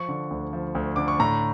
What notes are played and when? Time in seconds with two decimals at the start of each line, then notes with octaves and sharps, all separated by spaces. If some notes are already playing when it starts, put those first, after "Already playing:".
Already playing: F3 C#6
0.08 D3
0.31 D2
0.53 F3
0.75 D2
0.96 D3 D6
1.08 C#6
1.20 A2 A#5